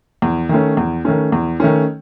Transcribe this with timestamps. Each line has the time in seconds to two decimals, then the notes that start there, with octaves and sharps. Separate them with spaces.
0.22 E2
0.49 D#3 A3 C#4
0.77 E2
1.05 D#3 A3 C#4
1.32 E2
1.60 D#3 A3 C#4